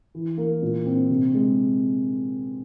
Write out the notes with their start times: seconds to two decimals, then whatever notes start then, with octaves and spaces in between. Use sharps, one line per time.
0.15 E3
0.38 A#3
0.62 A#2
0.86 C4
1.10 C3
1.34 G#3